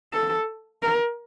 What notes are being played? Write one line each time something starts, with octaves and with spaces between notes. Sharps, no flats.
A4
A#4